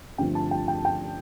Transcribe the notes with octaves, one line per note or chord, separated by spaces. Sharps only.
G2 D3 F3 A3 C4 G5
A5
G5
G5
G5